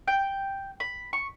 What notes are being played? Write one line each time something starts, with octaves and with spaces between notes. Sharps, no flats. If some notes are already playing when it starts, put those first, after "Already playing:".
G5
B5
C#6